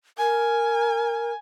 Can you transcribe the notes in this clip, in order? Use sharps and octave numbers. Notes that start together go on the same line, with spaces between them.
A#4 G#5